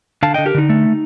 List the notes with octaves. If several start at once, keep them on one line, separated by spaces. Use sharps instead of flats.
D3 F5 A5
D3 D#5 G5
G4 A#4
D3 D#4
A3